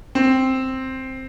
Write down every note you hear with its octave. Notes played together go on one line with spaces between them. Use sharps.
C4